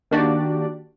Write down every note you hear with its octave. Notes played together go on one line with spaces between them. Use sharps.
D#3 A#3 D4 F#4 G4 D5